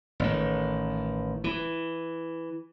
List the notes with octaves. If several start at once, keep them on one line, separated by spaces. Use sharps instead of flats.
A1 D#3
E3